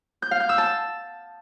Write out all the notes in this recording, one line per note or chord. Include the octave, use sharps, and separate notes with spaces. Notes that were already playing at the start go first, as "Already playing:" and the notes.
G6
F5
G6
E6
A5